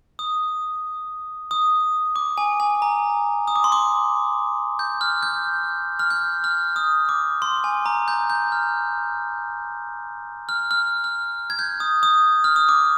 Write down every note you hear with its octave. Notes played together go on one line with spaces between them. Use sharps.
D#6
D#6
D6
G#5
G#5
A#5
D#6
D6
C6
D6
G6
F6
G6
F6
G6
F6
D#6
D6
C6
G#5
A#5
G6
G6
F6
F6
F6
F6
G#6
G6
D#6
D#6
F6
D#6
D6